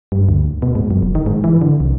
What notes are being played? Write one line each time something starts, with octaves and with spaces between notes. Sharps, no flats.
G2
D2
B2
G#2
F#2
F#1
D#3
G#2
E3
D3
C2